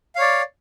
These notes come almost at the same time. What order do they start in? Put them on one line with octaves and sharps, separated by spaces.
F5 C#5 D5